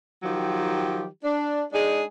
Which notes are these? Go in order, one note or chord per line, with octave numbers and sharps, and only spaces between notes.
D#3 F3 F#3 G4
D4
G#3 D4 D#4 G#4